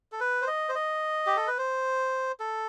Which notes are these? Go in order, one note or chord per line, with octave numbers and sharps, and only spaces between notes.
A4
B4
C5
D#5
C5
D#5
G4
A4
B4
C5
A4